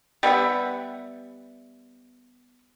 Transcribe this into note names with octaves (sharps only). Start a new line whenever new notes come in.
G3 B3 E5 F#5